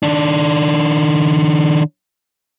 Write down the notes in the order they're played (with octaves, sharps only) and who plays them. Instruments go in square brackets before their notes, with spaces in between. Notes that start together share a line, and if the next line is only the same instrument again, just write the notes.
[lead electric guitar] D#3 D4